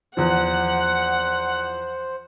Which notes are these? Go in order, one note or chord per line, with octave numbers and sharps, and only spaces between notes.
E2 F3 C5 F#5